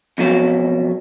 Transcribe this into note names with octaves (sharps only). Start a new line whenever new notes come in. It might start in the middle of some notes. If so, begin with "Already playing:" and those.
F2 B2 F#3